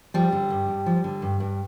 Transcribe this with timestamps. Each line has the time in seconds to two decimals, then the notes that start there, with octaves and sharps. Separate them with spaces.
0.14 F3 G3
0.32 D3
0.50 G2
0.68 G2
0.86 F3
1.04 D3
1.22 G2
1.40 G2